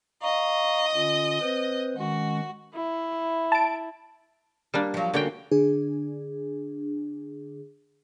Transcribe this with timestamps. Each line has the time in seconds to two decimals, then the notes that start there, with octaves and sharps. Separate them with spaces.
0.22 D#5 F5 A#5 C#6
0.95 D3 C#4 F4
1.41 C4 B4 C5
1.96 D#3 G#3 C#4 F#4
2.75 E4
3.52 A5 D7
4.74 G3 A#3 D4
4.94 F3 F#3
5.14 D3 A#3 C#4 F#4 G5
5.51 D3 D4 G#4